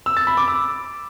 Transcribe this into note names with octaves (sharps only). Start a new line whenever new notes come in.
E6
A6
B5
D6
E6